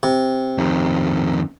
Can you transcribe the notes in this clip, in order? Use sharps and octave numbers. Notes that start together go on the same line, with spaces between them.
C3
F2 D#3